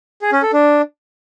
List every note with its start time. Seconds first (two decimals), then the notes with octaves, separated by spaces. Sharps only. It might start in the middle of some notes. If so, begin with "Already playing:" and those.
0.22 G#4
0.32 C#4
0.42 A4
0.53 D4